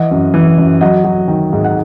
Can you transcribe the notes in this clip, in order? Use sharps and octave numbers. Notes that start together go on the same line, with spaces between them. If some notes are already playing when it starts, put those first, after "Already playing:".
Already playing: E3 D#5 F#5
F#2
E3
F#2
F#3 D#5 F#5
F#3
D#3
G#2
F#5